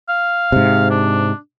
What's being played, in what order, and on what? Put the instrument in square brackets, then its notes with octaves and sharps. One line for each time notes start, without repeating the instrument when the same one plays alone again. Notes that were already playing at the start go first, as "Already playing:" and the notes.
[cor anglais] F5
[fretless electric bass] G#2 C3
[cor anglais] D4